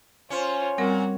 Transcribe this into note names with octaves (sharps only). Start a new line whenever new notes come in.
C#4 F4 C5
A#2 G3 C4 F#4 A#4